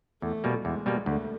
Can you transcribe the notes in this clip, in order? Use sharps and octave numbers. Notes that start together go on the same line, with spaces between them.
E2 A3
B2 G3 A#3
E2 G#3
B2 G3 A#3
D2 A3